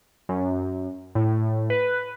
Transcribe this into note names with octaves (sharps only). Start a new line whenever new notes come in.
F#2
A2
B4